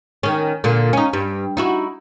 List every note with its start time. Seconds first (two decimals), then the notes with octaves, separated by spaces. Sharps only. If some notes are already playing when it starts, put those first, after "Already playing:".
0.23 D#3 C#4
0.64 A#2 D3
0.93 C#4 D#4
1.13 G2
1.57 D#4 E4 F#4